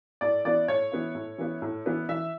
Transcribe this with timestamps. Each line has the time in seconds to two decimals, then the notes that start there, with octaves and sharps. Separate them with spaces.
0.21 A2 D5
0.45 E3 B3 E4 D5
0.68 A2 C#5
0.92 E3 B3 E4
1.15 A2
1.38 E3 B3 E4
1.62 A2
1.86 E3 B3 E4
2.09 E3 E5